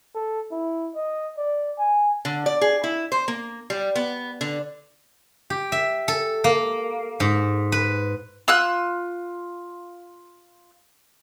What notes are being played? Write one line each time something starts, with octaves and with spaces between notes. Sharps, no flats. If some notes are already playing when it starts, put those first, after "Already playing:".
A4
E4
D#5
D5
G#5
D3
D5
G#4
E4
C5
A#3
G3
B3
D3
G4
E5
A4
A#3
G#2
B4
F4 E6 F#6